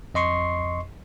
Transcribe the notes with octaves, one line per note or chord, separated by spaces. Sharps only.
F2 D#5 C6 C#6 C7